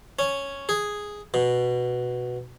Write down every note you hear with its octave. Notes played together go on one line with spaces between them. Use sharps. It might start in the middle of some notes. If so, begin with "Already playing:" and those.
C#4
G#4
B2